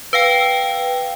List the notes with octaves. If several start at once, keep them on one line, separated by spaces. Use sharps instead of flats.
B4 F5 G5